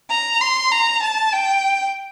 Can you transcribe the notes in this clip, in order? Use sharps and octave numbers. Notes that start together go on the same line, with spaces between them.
A#5
C6
A#5
A5
G5